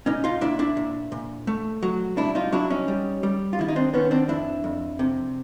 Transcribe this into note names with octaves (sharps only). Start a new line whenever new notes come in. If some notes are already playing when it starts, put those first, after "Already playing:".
A#2 C#4 D#4
D#4 F4
A#2 D4 E4
D4 E4
A#2
A#2
A3
F#3
C2 D4 E4
D#4 F4
F#3 D4 E4
C#4 D#4
G3
G3
F4
D#3 E4
D#4
C4 D4
D#3 B3 C#4
C4 D4
F2 D4 E4
F2
C3